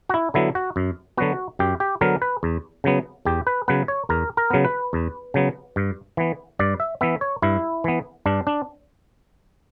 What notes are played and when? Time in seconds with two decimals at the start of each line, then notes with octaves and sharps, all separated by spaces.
0.09 F#4
0.14 E4
0.34 D3 F#3 B3 E4
0.55 F#4
0.76 F#2
1.17 D3 F#3 B3 F#4
1.59 F#2 G4
1.80 G4
2.01 D3 F#3 B3 A#4
2.22 B4
2.43 E2
2.84 C#3 F#3 B3
3.25 E2 G4
3.47 B4
3.68 C#3 F#3 B3 B4
3.88 C#5
4.09 E2 A#4
4.37 A#4
4.50 C#3 F#3 B3
4.65 B4
4.93 E2
5.34 C#3 F#3 B3
5.76 G2
6.17 E3 B3
6.59 G2 D5
6.80 E5
7.01 E3 B3 E5
7.21 C#5
7.42 G2 E4
7.84 E3 B3
8.26 G2 D4
8.47 D4